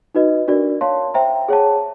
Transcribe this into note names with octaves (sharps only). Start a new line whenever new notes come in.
D#4 F#4 B4 D#5
D4 F#4 A#4 D5
C#5 F5 A5 C6
C5 E5 G5 A#5
G#4 C#5 F#5 A5